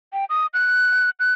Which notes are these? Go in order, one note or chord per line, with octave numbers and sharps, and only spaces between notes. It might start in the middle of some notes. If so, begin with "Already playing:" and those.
G5
D#6
F#6
F#6